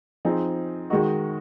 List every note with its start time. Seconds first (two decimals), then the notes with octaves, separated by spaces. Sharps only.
0.25 F3 C4 D#4 G#4
0.90 D#3 G#3 D#4 F#4